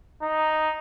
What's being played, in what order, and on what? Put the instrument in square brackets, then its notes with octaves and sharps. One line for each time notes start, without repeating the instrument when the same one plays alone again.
[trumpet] D#4